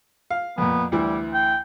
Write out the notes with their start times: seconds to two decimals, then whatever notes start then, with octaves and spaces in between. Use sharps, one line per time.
0.31 F5
0.58 F2 A#2 B3
0.92 D2 E3 G3 E4
1.34 G5